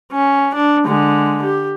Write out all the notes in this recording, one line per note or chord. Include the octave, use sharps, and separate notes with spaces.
C#4
D4
D3 G#3
G4